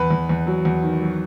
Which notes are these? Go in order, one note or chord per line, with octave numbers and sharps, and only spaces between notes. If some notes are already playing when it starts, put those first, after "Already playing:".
Already playing: E2 B4
E2
E2
F#3
E2
D#3
F#3